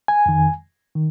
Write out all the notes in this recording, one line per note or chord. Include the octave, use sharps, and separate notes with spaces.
G#5
F2 D#3
D#3